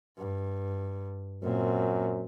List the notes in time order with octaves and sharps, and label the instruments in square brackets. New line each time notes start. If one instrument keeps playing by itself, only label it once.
[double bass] G2
[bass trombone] F#2 [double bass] A#2 C4